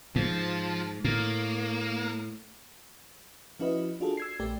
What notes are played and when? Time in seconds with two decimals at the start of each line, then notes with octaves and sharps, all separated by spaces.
0.16 G#2 F3
1.05 A2 A#3
3.59 F3 C#4 E4 F#4 B4 D#5
4.00 D4 F4 F#4 G#4 A4
4.17 E6 G#6 C7
4.39 A#1 A3 G4 D5